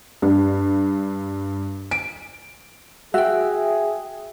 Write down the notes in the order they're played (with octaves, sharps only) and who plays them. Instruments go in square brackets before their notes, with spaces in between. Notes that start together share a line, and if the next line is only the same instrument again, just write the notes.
[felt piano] G2
D7
[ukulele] F#4 G5 [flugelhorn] G#4 [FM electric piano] E5